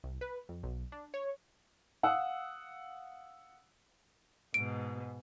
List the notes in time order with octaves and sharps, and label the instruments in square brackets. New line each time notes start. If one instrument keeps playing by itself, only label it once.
[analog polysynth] C2
B4
F2
B1
D4
C#5
[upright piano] F5 F#5 D#6 E6
[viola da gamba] G#2 B2 [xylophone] D7